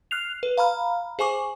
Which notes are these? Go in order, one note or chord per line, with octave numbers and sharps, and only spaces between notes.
F6 F#6 C7 F7
B4
F5 A#5 B5 F6
G#4 C5 G#5 C#6 D6